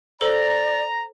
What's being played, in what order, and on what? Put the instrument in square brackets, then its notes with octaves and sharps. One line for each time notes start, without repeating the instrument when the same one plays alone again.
[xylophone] A4 C5 G7 [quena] D5 [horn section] A#5